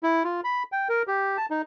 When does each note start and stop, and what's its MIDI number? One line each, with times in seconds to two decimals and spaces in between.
0.03 0.23 64
0.24 0.41 65
0.44 0.63 83
0.72 0.88 79
0.89 1.03 70
1.07 1.37 67
1.37 1.46 81
1.50 1.62 63